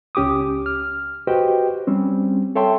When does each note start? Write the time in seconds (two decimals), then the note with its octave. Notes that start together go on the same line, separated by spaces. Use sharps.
0.15 C#2 C#4 G4 D6 D#6
0.66 F6
1.27 F#4 G4 B4 C5 D#5 G5
1.87 G3 C4 C#4
2.56 A4 C#5 E5 G5 A5 C6